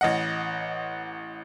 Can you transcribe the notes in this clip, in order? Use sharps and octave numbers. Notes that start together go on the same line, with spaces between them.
A1 D#5 F#5